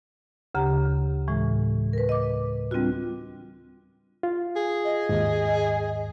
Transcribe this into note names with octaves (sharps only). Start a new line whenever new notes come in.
D2 C#3 G4 A#5
A2 E3 G#3
A#4 B4
D#5 D6
G3 C4 D4 F4 F#4
F4
G#4
D#5
D#2 G#2